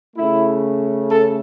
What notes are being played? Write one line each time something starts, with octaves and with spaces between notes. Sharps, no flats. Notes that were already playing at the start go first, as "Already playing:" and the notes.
C#3 A3 E4
A4